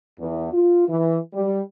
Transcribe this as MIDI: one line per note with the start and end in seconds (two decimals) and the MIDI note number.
0.19 0.49 40
0.52 0.87 65
0.88 1.18 52
1.34 1.60 55